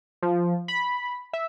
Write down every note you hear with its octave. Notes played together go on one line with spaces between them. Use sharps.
F3
B5
E5